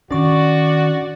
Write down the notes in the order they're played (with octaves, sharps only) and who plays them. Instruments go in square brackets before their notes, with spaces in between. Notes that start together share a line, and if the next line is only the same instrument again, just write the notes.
[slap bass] D#3 D4 [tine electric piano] C#4 C#6 [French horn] F#4 [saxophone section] D5